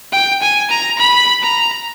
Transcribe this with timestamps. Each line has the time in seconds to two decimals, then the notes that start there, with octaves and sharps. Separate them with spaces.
0.12 G5
0.42 G#5
0.70 A#5
0.99 B5
1.42 A#5